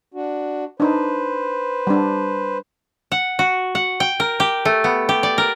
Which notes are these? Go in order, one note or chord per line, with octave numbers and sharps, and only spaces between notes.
D4 F#4
D4 D#4 B4 C5
G3 D4
F#5
F#4
F#5
G5
A#4
G4
A3
B3
G4
D5
A#4